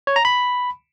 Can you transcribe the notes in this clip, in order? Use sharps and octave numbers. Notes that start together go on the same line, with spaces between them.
C#5
A#5
B5